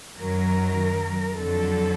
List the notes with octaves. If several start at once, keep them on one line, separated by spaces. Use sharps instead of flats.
F#2 D#3 F#3 A#4
F2 D3 F#3 A4